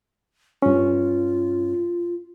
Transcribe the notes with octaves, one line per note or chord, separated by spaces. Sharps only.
G2 C#4 F4